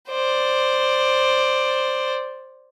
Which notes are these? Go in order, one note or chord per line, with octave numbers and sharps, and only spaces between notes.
C5 D5